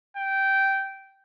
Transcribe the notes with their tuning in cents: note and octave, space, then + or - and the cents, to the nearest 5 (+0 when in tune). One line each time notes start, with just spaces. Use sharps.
G5 -10